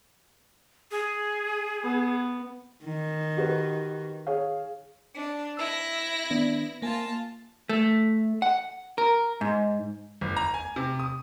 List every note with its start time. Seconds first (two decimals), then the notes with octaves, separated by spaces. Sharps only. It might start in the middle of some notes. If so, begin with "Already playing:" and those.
0.91 G#4
1.83 B3
2.84 D#3
3.37 F#4 G4 B4
4.27 G#4 C#5 F5
5.15 D4
5.57 E4 E6 A#6
6.30 D#3 B3 D4
6.82 A#3 F4 G#5 A5
7.69 A3
8.42 F#5
8.98 A#4
9.41 G#2
10.21 G1
10.37 A#5
10.54 G#5
10.76 C3
10.99 D#6